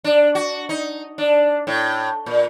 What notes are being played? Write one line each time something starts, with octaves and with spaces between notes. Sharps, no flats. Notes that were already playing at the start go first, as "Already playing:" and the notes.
D4
F#4
D#4
D4
A2
A#2